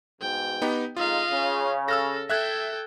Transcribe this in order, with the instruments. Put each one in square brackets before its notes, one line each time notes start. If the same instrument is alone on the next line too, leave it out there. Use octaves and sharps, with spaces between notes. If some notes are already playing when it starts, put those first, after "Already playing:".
[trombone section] G#2 B2 [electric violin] G5
[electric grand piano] B3 D#4 G4
[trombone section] F2 G#3 D#4 [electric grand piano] F4 [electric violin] D#5 F5
[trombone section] C#3
[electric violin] A4 [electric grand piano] E6 F6 A#6
[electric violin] A4 G5 [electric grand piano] E5 F#6 G#6